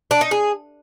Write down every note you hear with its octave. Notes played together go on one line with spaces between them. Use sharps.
D4
D#4
G#4